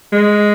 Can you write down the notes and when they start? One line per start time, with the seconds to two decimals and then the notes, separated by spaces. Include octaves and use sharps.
0.13 G#3